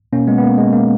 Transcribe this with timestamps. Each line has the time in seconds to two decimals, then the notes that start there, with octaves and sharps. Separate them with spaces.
0.13 B2 A#3 C#4
0.28 G#3 B3
0.38 B3
0.43 A#3
0.58 G#3
0.73 A#3